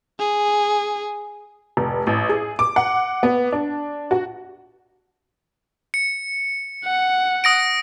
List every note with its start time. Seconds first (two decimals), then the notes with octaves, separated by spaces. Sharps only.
0.19 G#4
1.77 F1
2.07 A1
2.29 G#4
2.59 D6
2.76 F#5
3.23 B3
3.52 D4
4.11 F#4
5.94 C#7
6.85 F#5
7.44 D#6 A#6 D7